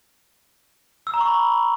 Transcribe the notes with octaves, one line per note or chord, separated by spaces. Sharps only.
E6
A#5
C#6
B5